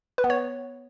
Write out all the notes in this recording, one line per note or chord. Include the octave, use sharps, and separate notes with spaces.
B4
B3
C#5